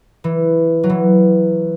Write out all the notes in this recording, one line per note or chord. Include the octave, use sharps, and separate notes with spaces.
E3
F#3
E3